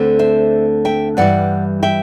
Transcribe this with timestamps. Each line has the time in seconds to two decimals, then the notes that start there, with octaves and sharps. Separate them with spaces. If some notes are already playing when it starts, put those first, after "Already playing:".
Already playing: D2 D3 A3 C4
0.19 C5 E5
0.85 E5 G5
1.17 G2 E3 G3 D5 F#5
1.83 E5 G5